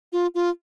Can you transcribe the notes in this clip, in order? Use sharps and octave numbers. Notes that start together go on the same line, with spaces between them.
F4
F4